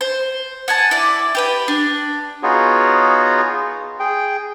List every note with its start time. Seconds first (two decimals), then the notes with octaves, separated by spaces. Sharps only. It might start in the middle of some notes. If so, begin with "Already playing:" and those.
0.01 C5
0.68 F#5 G#5 A5
0.91 E4 D5
1.35 G4 B4 G5
1.68 D4
2.43 B3 D#4 F4 F#4 G#4 C#5
4.00 G#4 G5